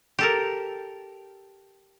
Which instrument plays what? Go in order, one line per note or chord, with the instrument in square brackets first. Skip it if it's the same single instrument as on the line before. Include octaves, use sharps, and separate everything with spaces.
[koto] G4 A4 A#4